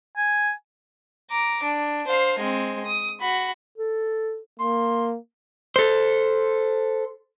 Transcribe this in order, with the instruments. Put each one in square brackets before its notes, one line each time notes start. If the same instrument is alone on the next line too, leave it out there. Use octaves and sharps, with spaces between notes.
[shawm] G#5
[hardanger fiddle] A#5 D6
D4
C5 F5
G#3 C4
D#6
F#4 B5
[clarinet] A4
[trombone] A#3 [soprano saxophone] C6
[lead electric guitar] A4 C5